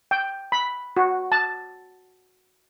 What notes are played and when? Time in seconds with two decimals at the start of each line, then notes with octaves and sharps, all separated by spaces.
0.11 G5
0.52 B5
0.97 F#4
1.32 A5